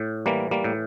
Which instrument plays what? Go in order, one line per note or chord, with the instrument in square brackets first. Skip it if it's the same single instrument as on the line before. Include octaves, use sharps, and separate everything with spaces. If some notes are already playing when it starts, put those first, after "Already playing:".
Already playing: [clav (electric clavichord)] A2
E3 G3 A#3
G3 A#3
A2